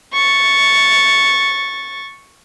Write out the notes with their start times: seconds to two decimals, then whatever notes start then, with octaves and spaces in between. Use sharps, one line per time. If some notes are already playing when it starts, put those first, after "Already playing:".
0.12 C#6 A6